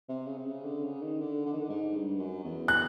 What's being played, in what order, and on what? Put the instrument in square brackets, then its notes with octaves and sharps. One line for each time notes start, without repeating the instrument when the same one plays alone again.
[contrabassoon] C3
C#3
C3
C#3
D3
C#3
D#3
D3
D3
D#3
D3
G#2
G2
F#2
E2
[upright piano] F#6